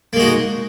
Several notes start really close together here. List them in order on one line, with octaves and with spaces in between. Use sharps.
A#3 G#3 F#4 D#4